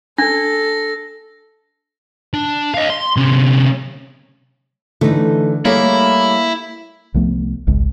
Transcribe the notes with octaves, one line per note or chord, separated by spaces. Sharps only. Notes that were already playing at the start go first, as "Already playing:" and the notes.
D4 A4 A#6
D4
D#5 F5
C6
C3 C#4
D3 E3 A3 D#4
G3 A3 A#3 E4 G#4 C#5
C2 F3 A3 B3
G#1 C#2 C#3 G#3